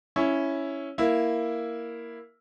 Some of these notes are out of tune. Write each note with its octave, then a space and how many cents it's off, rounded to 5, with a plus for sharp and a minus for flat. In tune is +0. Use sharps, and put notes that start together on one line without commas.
C#4 +0 E4 +0
A#3 +0 E4 +0